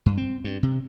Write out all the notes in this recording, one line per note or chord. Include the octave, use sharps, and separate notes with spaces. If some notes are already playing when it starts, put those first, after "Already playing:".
G2
C4
G2
C3